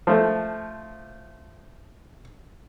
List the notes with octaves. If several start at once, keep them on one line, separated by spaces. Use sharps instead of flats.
F3 A3